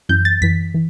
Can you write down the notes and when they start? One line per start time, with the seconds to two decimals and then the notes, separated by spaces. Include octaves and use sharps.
0.09 F#2 E3 G6
0.25 A6
0.41 F#2 E3 B6
0.74 E3